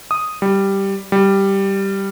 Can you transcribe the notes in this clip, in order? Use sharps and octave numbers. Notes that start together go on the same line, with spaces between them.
D#6
G3
G3